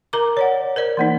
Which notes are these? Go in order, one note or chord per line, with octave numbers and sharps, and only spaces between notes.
A#4 A#5 D6
C#5 D5 F#5
A#4 C5 D5
E3 A#3 D#4